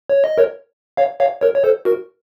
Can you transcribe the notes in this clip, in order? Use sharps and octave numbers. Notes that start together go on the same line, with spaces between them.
C#5
D#5
A#4 C#5
C#5 F5
C#5 F5
A#4 C#5
C#5
A4 C5
F#4 A#4